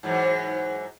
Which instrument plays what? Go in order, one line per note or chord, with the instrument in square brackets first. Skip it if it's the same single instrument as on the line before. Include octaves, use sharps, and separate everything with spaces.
[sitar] G#2 E3 F#3